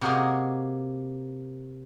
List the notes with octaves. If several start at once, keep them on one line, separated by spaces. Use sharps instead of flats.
C3 A#3 F#4 G#4 D#5 G#5